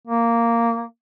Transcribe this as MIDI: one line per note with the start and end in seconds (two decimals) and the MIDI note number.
0.07 0.83 58